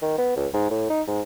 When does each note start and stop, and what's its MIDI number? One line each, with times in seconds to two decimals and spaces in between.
0.02 0.17 51
0.18 0.32 59
0.36 0.47 37
0.53 0.70 44
0.70 0.87 45
0.90 1.02 63
1.07 1.21 44